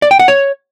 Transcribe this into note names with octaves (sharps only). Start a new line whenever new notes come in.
D5
G5
F#5
C#5